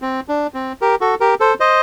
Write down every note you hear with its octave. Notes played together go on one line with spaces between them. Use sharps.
C4
D4
C4
G4 A#4
F#4 A4
G4 A#4
A4 C5
C5 D#5